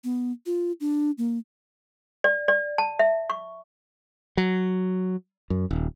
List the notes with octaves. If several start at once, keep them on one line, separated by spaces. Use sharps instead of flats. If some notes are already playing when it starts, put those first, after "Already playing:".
B3
F4
D4
A#3
D5
D5
A5
E5
C#6
F#3
F#2
D#1